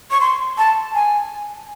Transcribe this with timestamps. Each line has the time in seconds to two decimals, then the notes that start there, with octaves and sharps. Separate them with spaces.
0.11 C#6
0.21 C6
0.58 A5
0.95 G#5